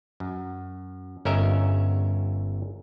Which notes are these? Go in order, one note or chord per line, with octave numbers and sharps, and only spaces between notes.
F#2
G1 C#4 A#4 D#5 E5